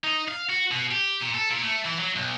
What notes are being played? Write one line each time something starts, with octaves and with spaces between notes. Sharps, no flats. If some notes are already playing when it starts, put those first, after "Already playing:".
D#4
F5
F#4
B2
G4
A#2
A4
A#2
A3
E3
F#3
B1